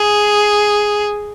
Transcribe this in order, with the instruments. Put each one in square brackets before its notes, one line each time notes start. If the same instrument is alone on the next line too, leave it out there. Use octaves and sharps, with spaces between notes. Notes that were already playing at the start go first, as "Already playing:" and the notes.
Already playing: [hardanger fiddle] G#4